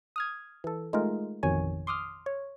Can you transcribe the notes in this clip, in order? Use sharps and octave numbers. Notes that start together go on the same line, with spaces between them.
D#6 F6 G#6
E3 A4
G#3 A3 D#4 F4 A#4
A1 F2 B2 D#3 C#5 G#5
C6 D6 D#6 F6
C#5